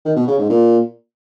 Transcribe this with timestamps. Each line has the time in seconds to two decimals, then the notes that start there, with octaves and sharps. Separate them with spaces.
0.05 D#3
0.16 B2
0.27 C#3
0.38 G#2
0.50 A#2